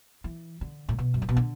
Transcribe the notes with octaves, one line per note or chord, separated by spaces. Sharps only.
E3
D3
A2
B2
F#2
A2
B2
D3